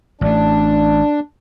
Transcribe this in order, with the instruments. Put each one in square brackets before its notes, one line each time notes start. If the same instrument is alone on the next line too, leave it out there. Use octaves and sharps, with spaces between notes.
[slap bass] A1 A3 [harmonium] D4